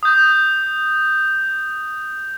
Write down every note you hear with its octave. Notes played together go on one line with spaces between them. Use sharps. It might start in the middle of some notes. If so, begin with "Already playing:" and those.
D#6 G6